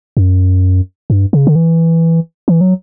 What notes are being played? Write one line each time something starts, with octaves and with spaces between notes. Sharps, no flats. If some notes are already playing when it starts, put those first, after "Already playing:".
F#2
G2
C#3
D3
E3
E3
F#3